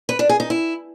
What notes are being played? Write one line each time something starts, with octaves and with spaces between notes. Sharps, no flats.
B4
D4
G#4
D#4
E4